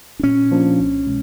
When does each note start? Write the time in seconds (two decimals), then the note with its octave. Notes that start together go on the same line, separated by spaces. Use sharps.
0.19 D4
0.23 A#2 C#4
0.51 F3 A#3 D4
0.79 C2
1.07 B2 G#3